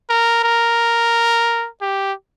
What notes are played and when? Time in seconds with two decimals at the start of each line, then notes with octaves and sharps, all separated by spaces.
0.10 A#4
0.43 A#4
1.82 G4